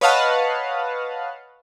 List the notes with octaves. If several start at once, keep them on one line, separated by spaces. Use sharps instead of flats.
B4 C#5 D#5 F5 F#5 A5